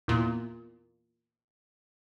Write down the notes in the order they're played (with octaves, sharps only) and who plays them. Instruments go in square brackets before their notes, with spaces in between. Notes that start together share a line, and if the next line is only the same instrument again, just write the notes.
[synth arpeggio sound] E2 A#2